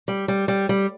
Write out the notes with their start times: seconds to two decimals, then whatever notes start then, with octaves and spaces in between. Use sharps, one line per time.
0.08 G3
0.28 G3
0.48 G3
0.69 G3